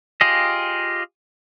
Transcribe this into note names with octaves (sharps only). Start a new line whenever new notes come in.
F4 G4 G#4 D#5